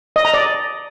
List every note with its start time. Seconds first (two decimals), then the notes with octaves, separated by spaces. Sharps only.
0.16 D#5
0.25 A#5
0.34 D5